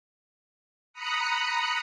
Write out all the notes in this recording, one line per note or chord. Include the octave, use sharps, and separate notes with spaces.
A#5 B5 D#6 F#6 C#7